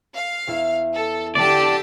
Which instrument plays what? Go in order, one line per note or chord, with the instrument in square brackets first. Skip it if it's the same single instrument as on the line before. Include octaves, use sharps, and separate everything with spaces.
[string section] F5
[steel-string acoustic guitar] E2 E4 E5
[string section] A4
[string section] D3 G4 A5 [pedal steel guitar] D5